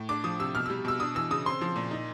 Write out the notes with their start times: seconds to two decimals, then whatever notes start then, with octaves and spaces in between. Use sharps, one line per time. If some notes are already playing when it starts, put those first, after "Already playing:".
Already playing: A2
0.09 D4 D6
0.24 F3 D#6
0.39 C3 E6
0.55 B2 F6
0.66 G3 E6
0.85 B2 E6
1.00 D4 D#6
1.15 E3 E6
1.31 C#3 D#6
1.46 C4 C6
1.61 F3
1.76 A#2
1.91 D#4